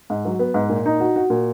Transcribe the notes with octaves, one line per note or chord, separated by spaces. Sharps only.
G#2
F#3
B3
G#2
A#2
D#4
F#4
F#4
A#2